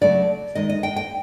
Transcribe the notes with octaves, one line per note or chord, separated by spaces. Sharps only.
C#3 F#3 A3 D5
D#3 G#3 D#5
D#5
G5
G5